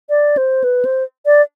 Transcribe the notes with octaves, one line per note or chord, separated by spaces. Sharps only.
D5
C5
B4
C5
D5